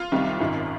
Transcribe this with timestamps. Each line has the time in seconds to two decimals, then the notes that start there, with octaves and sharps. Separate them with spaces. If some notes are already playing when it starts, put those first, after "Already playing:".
Already playing: F4
0.12 C2 C3 D#3 G3
0.40 G#1 F#2 D#3